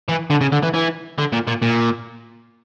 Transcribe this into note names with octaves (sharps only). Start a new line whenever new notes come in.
E3
D3
C#3
D3
E3
E3
D3
A#2
A#2
A#2